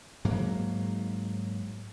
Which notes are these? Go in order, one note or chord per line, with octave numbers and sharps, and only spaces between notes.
G#2 F#3 A#3